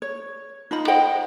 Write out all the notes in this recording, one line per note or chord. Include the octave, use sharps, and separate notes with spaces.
C#5
D#4 F4 D#5 B5
C5 D#5 F#5 G5